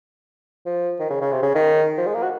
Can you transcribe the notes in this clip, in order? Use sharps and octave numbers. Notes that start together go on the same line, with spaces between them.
F3
D#3
C#3
C#3
C3
C#3
D#3
F3
G#3
A#3
F#4